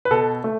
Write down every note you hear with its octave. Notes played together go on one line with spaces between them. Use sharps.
B4
B2 A4
A3